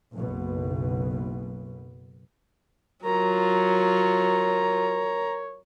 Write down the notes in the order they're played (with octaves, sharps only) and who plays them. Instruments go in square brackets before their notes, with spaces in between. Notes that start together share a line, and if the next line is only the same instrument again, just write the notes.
[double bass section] F#1 B1 B2
[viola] F#3 F4 [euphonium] A#4 [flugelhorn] C#5 [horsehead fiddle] A#5